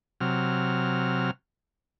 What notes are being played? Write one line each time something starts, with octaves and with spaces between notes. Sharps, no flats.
C3 F#3 F6